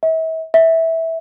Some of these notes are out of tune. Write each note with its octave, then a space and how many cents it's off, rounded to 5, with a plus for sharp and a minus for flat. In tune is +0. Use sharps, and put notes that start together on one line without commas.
E5 -40
E5 -15